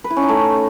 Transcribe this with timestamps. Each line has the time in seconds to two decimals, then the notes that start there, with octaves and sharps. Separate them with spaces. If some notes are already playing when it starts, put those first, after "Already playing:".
0.04 B4
0.10 E4
0.17 C#4
0.23 D#4
0.29 A3